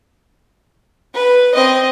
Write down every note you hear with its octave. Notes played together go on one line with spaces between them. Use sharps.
B4
C4 D#5